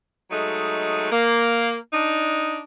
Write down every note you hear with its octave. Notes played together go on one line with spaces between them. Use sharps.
F#3 G#3 A3 D#4
A#3
D4 D#4